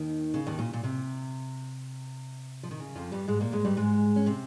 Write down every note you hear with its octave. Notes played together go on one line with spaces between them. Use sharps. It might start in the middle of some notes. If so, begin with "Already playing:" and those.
Already playing: D#2 D#3
C#3
D#2 D#3
A#2
A#2
C3
F3
D#3
C#3
F2 F3
G2 G3
G#2 G#3
A#2 A#3
G#2 G#3
G2 G3
G#2 G#3
C#4
C3 C4